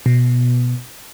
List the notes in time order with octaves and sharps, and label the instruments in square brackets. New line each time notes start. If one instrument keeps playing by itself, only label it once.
[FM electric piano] B2